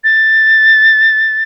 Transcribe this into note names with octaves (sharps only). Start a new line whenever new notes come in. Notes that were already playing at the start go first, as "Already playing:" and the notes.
A6